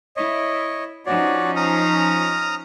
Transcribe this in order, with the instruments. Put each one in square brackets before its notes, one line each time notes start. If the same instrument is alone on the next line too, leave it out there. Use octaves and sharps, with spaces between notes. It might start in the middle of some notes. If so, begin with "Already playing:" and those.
[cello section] E4 [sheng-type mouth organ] C#5 D#5
[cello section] F3 C#4 D#4 [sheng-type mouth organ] F#4 C#5 D5
[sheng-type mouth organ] A#5 D#6 F6